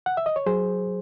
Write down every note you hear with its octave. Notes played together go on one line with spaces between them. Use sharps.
F#5
E5
D#5
C#5
F#3 G#4 C5